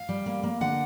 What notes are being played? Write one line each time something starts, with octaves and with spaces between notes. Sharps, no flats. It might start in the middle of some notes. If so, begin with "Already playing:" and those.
Already playing: F5
G3
A#3
A#3
D3 F#5